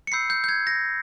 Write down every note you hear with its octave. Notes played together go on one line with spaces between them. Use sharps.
C#7
B5 E6 G6 C7
G6
G6
G#6
A#6